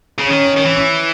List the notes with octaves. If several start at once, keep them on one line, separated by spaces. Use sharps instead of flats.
C#3
D#3 C#4
D#3
E3